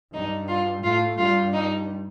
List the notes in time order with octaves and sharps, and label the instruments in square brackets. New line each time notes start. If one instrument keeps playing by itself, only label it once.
[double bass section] G2 G3 [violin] D#4
[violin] F4
[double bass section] A2 A3 [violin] F4
[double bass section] G2 G3 [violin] F4
[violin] D#4